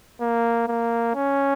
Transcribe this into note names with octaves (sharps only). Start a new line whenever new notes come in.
A#3
A#3
C#4